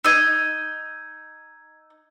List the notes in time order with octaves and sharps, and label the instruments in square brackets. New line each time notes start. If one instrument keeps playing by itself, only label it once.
[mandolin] D#4 D#5 [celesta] E6 G#6